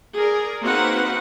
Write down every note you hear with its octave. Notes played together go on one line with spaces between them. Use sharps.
G#4 A#4 D5
A#3 C4 D#4 F#4 B4 F#5